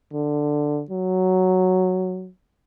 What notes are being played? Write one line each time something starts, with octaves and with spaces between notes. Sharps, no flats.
D3
F#3